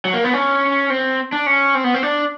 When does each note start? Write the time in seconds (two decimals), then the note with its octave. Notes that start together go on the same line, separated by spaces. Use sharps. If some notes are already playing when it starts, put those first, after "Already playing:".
0.05 F#3
0.14 A#3
0.24 B3
0.33 C#4
0.90 C4
1.33 D4
1.46 C#4
1.75 C4
1.84 B3
1.94 C4
2.03 D4